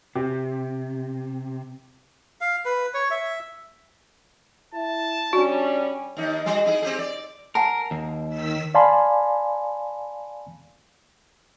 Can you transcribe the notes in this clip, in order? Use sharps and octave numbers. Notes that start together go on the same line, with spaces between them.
C3 G4 G5
F5
B4
C#5
E5
E4 A5
G3 C#4 D4 F#4
D#2 D#4
G3 F#4
D#4 E4 G#4
C4 G4 G#4
D5
A#4 F#5 G#5 A5
D#2
D#3 E6 B6
D5 F5 G#5 A5 B5 C6